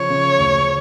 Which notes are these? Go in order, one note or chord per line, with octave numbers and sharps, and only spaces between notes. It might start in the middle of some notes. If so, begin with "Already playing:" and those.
Already playing: C#3 F3 C#5
C#3
D2